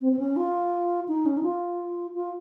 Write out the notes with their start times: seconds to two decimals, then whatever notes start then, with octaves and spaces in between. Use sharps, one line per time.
0.01 C4
0.12 C4
0.19 C#4
0.36 F4
1.08 D#4
1.26 C#4
1.37 D#4
1.43 F4
2.14 F4